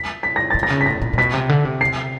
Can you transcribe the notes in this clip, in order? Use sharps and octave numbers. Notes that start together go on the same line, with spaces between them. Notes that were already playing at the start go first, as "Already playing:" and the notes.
Already playing: B6
B6
A#6
C3 A6
A#6
C#3
B6
A2 A#6
A#2
A#2
B2 B6
C3
D3
C3
C7